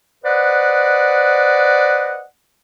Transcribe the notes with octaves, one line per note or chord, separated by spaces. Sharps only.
B4 C5 D5 D#5 F#5